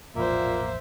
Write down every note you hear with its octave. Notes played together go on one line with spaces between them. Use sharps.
E1 A1 A#2 F3 A#3 C5 E5